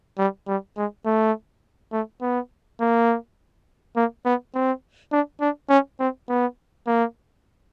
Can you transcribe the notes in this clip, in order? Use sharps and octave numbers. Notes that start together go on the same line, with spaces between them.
G3
G3
G#3
A3
A3
B3
A#3
A#3
B3
C4
D4
D4
C#4
C4
B3
A#3